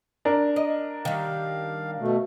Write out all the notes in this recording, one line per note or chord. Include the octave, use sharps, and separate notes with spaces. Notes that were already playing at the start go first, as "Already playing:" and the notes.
D4 A#4
D#5
D#3 G3 F5
B2 A3